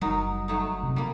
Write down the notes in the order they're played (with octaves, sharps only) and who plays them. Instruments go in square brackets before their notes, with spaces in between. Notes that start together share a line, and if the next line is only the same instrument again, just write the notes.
[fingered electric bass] F#1 G3 [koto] F#3 D#4 A#4
[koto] F#3 A3 D#4
[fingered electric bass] C3
[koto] G3 A#3